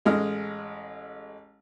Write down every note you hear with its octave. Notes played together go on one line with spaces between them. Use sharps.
A1 G#3 D#5 F6